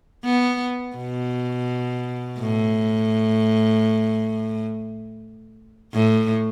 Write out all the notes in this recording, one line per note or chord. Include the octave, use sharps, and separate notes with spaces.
B3
B2
A2
A2